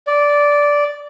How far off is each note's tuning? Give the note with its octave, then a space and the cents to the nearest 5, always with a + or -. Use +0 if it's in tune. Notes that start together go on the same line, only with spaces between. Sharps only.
D5 -10